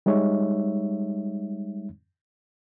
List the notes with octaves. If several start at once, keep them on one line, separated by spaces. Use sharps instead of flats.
G3 G#3 D#4 C#5 E5